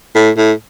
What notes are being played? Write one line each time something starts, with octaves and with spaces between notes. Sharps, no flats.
A2
A2